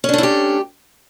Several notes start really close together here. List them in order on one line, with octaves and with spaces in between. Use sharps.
C#4 D4 A3 E4 G4